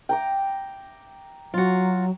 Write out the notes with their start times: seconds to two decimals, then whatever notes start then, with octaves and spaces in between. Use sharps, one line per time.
0.09 G5 A#5 D6
1.54 F#3 F4 F#4